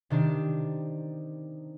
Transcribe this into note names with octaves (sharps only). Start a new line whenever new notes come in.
C3 D#3 D4 G4